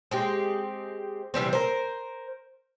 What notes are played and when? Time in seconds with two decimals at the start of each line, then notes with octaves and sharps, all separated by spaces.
0.11 G#3 C4 G4
1.34 C3 E3 G3 C4
1.53 A#4 C5